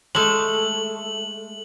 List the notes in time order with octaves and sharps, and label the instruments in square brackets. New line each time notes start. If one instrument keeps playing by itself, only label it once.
[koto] G#3 A3 [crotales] F#7